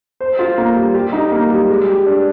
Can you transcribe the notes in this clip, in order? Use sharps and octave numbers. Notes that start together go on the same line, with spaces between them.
C5
F4
A#3
G3
G4
D#4
A#3
G3
G#3
G4
D4